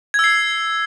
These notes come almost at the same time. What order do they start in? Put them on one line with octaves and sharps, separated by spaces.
G#6 E6 C7